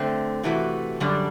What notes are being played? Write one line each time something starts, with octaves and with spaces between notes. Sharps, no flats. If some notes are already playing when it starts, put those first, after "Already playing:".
Already playing: D3 A3 C4
C3 E3 A3 D4 F#4
F#2 D3 G3 D4